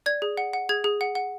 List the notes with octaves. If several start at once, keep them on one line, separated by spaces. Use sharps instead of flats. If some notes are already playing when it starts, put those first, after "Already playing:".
D5 G#6
G#4
F#5
F#5
G#4 G#6
G#4
F#5
F#5